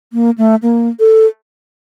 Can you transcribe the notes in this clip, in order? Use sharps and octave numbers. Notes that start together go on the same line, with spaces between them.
A#3
A3
A#3
A4